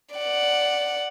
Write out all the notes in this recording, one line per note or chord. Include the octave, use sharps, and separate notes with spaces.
D5 F#5